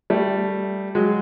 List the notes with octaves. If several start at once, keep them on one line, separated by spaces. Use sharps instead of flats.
G3 A3
F#3 G#3